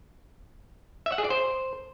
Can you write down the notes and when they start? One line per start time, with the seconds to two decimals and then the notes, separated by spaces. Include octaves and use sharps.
1.06 E5
1.12 F#5
1.18 G#4
1.24 D5
1.30 C5